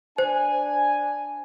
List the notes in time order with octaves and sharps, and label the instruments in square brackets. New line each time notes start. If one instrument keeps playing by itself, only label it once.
[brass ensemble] D4 G#5 [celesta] C5